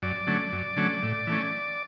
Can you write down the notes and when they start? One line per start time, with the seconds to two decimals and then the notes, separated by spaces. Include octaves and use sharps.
0.02 F#2 D5
0.27 D3 F#3 A3 C#4
0.52 F#2
0.77 D3 F#3 A3 C#4
1.03 A2
1.27 E3 A3 C#4